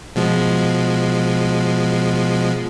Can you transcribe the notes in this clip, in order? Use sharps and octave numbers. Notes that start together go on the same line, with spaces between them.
B2 F3 G#3